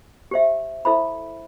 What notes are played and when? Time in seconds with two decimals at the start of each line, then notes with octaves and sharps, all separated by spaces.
0.31 G4 C5 E5
0.85 E4 A4 C5 E5 B5